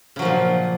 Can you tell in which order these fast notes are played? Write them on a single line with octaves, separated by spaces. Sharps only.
C#3 F#3 F3 A#2